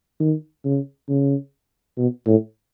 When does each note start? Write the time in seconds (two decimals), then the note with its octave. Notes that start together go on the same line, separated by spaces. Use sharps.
0.20 D#3
0.65 C#3
1.08 C#3
1.98 B2
2.26 A2